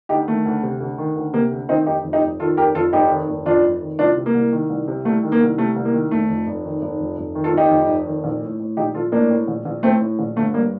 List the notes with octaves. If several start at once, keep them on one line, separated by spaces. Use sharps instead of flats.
D2 D#4 G4
D#3 A3
D2
C3
D2
D#3
D2
C3 A#3
D2
D#3 C4 D#4
F1 D#4 G4
F2
D#4 G4
F1
D#3 F4 A4
F1 G4 A#4
F2 F4 A4
F1 D#4 G4
D#3
F1
F2 D4 F4
F1
D#3
C2 D4 F4
C3
A#3
C2
D#3
C2
C3
C2 A3
D#3
A#3
C2
C3 A3
C2
A#3
D#3
F1 A3
F2
F1
D#3
F1
F2
F1
D#3
F4 A4
F1 D#4 G4
F2
F1
D#3
A#1
A2
A2
A#1 D#4 G4
A#1 F4 A4
A2 A#3 D4
A2
A#1
A#1
A2 A3 C4
A2
A#1
G1 A3
G2 A#3